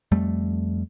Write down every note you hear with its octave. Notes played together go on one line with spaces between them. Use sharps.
F2 G3 A3